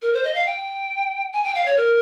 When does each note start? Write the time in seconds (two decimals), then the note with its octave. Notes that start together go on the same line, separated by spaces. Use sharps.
0.02 A#4
0.13 C5
0.24 D#5
0.35 F5
0.46 G5
1.33 G#5
1.44 G5
1.55 F5
1.66 C#5
1.76 A#4